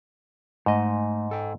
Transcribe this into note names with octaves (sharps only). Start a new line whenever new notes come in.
G#2 A3 D#5
A4 G5